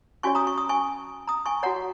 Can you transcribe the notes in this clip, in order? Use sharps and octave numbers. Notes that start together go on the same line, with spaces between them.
C#4 F#4 C#5 G#5 C#6
A#5 D#6
C#6
D#6
G#5 C#6
A#5 D#6
G#5 C#6
F#4 C#5 F#5 A#5